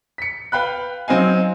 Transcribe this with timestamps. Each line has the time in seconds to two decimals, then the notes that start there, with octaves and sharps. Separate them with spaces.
0.18 B6 C#7
0.52 B4 F5 G5 B5 F#6
1.08 F#3 C4 D#4 F5 G#5